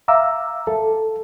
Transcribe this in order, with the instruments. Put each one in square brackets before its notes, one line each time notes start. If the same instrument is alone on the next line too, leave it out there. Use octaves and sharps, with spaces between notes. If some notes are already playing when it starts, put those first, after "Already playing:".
[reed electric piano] E5 F5 A#5 D6 E6
A4